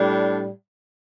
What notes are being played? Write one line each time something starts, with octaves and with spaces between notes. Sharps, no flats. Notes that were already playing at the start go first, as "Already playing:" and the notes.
Already playing: A2 G3 D4